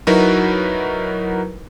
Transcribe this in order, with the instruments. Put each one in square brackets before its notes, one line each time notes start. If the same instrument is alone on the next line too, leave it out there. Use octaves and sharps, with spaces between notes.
[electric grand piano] F#3 D#4 E4 F#4 A#4 B4